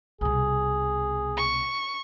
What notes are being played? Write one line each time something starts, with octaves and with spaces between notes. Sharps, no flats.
C2 B2 G#4
C#6